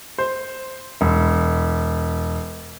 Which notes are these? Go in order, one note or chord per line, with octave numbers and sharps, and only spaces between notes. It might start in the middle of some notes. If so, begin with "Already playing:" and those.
C5
E1